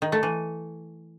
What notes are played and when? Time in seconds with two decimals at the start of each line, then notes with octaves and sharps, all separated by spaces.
0.02 D#3
0.12 A3
0.23 E3